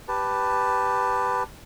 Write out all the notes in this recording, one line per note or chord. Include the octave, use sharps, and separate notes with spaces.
G4 B4 A5